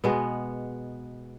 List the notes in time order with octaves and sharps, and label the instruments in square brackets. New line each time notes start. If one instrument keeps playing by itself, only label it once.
[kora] B2 G#3 B3